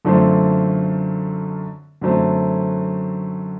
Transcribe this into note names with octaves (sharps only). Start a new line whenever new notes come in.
F#2 D3 F3 A3 C4
F#2 D3 F#3 A3 C4